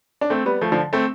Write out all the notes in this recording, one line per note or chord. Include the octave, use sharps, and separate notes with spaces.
D4
A3 C4
G3 B3
F3 A3
D3 F3
A3 C4